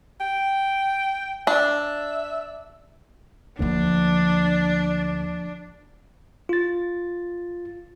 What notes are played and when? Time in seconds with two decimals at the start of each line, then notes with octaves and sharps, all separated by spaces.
0.20 G5
1.47 D4 E5
3.59 D2 F3 A#3 D4
6.49 F4 A6